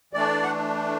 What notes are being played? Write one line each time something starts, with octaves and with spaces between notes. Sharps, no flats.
E3 A3 D4 D5
F#5